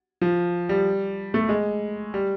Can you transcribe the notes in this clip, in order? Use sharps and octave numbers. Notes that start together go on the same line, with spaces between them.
F3
G3
A3
G#3
G3